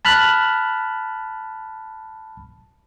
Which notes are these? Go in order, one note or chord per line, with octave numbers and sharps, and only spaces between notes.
A5 B5 F6 F#6